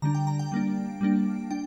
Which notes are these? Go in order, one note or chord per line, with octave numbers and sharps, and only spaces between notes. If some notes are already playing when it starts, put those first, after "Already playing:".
D3 G3 D4 A#5
G5
A#5
G5
G3 A#3 D4
G3 A#3 D4
D4 G5